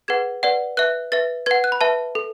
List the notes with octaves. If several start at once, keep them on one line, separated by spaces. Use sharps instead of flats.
G#4 B4 F#5 G#6
B4 D5 F#5
B4 E5 F#6
B4 E5 A6
B4 F#5 G#6
F#6
B5
B4 E5 A5
A4